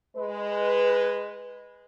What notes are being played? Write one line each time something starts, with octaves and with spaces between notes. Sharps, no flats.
G#3 B4